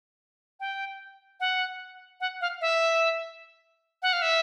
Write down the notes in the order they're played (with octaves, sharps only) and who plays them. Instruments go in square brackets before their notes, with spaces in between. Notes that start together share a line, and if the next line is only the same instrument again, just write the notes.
[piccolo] G5
F#5
F#5
F5
E5
F#5
F5
E5